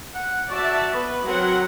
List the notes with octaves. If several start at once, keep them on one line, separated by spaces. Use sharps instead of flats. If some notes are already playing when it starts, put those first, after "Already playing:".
F#5
F#4 D5 E5 A5
B3 B4
F#3 C4 A#4 F#5